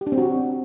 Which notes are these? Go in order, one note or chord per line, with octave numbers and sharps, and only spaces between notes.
G4
D4
C4
F#4